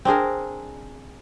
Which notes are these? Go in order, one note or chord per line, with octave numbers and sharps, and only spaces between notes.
C4 D4 G#4 A#4